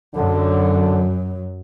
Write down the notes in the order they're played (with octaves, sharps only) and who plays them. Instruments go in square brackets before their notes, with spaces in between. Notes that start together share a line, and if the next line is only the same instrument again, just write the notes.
[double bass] F#2 F#3 [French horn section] D3